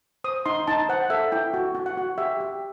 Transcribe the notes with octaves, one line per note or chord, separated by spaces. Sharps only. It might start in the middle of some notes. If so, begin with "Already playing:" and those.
C5 D#6
D#4 C6
D#4 A5
C5 F#5
A4 E5
E4 G5
F#4
F#4
F#5
F#4
G4 E5
G4